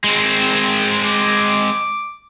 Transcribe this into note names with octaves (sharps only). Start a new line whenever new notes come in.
G#3 C4
D6